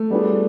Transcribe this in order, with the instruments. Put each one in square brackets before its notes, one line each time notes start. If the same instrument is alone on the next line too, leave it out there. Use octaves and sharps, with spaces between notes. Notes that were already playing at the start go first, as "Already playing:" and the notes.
Already playing: [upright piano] A3
[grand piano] G3 B3 D4 F4 G#4